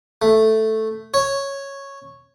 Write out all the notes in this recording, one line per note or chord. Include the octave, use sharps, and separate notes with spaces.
A3
C#5